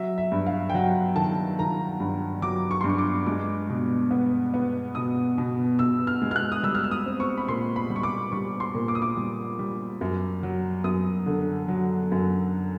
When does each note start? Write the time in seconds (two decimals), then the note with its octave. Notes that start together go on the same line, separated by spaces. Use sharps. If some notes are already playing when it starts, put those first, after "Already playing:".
Already playing: F#3 E5
0.18 E5
0.32 G2
0.46 F5
0.70 G5
0.74 F#3 F#5
1.16 D#3 A5
1.59 D#3 A#5
2.00 G2
2.42 F#3 D6
2.71 C#6
2.81 G2 C6
2.89 C#6
2.98 D6
3.26 G#3 D6
3.69 B2
4.11 B3
4.54 B3
4.95 B2 D#6
5.38 B2
5.79 B2 E6
6.07 F6
6.22 G#3
6.31 F6
6.36 F#6
6.52 D#6
6.63 G3 E6
6.75 F6
6.84 E6
6.91 D#6
7.06 C4
7.20 C#6
7.37 B5
7.48 A#2 C6
7.76 B5
7.90 G3
7.96 C#6
8.03 D6
8.32 G3 C#6
8.60 C6
8.75 A#2
8.88 D6
8.95 D#6
9.02 D6
9.17 G3
9.59 G3
10.01 F#2
10.43 F#3
10.84 F#2 D#6
11.26 D3
11.68 F#3
12.12 F#2